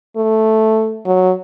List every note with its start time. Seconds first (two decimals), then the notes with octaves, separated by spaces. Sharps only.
0.16 A3
1.06 F#3